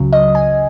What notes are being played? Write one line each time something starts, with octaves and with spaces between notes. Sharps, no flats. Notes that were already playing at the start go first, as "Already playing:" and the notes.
Already playing: C#2 C#3 F#3
D#5
G#5